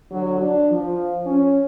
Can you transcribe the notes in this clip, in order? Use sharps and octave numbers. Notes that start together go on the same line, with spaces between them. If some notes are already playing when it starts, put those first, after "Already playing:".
D3 F#3
D4
F3
C#4